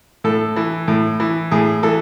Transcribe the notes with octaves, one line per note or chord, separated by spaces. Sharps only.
A2 A4
E3
A2
E3
A2 G#4
E3 A4